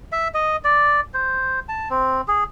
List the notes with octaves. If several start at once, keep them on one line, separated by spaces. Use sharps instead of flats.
E5
D#5
D5
C5
A5
C4
G#4